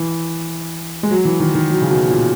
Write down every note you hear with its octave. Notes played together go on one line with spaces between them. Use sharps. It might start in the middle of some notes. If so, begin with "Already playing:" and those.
Already playing: E3
G#3
F#3
E3
D#3
D#3
F#3
C#3
B2
A#2